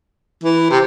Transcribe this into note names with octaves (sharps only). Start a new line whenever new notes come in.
E3
C3